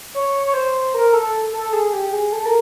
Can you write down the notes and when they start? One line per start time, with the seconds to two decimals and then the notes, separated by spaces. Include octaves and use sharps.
0.15 C#5
0.46 C#5
0.54 C5
0.94 A#4
1.13 A4
1.53 A4
1.73 G#4
1.93 G4
2.13 G#4
2.32 A4
2.45 A#4